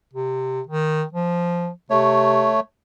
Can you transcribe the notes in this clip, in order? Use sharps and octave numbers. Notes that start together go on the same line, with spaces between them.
C3
D#3
F3
C3 A3 C#5